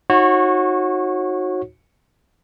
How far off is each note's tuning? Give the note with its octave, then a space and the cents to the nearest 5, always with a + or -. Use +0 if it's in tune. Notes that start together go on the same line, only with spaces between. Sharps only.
D#4 +15 F#4 -15 C#5 -30